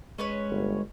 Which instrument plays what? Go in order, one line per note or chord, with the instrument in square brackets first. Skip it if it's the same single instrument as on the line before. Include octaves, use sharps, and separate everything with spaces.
[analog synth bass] G#3 [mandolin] C#4 B4 C#5
[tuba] G1